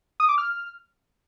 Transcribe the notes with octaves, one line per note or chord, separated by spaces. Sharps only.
D#6
D6
F6